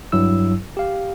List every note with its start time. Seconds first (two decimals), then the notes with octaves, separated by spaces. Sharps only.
0.12 G2 F#3 E4 E6
0.77 G4 F5